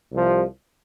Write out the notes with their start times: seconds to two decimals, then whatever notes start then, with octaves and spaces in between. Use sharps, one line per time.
0.12 C2 C3 F3